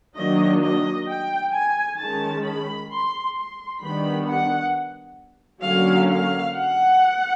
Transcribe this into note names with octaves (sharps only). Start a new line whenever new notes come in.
D#3 F#3 A#3 D4 D#5
D#5
G5
G#5
D#3 G#3 C#4 A5
B5
C6
C6
D#3 G3 B3 D4 B5
F#5
D3 F#3 A#3 C#4 F5
F5
F#5